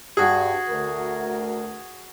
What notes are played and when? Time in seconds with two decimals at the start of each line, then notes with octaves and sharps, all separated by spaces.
0.17 G2 F#4 G#4
0.69 D2 A#4